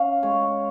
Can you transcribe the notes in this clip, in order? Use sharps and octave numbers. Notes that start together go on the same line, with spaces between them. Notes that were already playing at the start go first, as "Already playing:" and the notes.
Already playing: C#4 F5
G#3 C#5